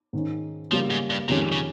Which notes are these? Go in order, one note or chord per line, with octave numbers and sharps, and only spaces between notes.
G#2 D#3 G#3 C#4
C#3 F3 G3 A#3
G#2
G2
F2 A#2 D#3 G#3 C#4 G4
C#3